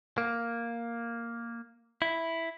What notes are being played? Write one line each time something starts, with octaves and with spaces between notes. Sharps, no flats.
A#3
E4